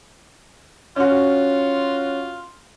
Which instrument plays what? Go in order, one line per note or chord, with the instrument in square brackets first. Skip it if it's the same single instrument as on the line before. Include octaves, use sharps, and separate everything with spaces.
[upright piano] C#4 F#4 [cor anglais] F4